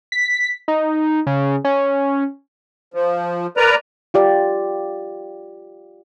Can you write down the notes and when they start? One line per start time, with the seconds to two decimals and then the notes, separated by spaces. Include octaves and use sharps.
0.12 B6
0.68 D#4
1.27 C#3
1.65 C#4
2.94 F3
3.57 A#4 B4 D5 A#5
4.14 F4 G4 D5